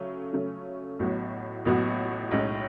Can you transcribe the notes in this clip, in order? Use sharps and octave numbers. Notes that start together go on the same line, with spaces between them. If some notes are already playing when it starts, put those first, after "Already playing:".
Already playing: C#3 F#3 A3 C#4
C#3 F#3 A3 C#4
A1 A2 F#3 B3 F#4
A1 A2 F#3 B3 F#4
B1 A2 G#3 C#4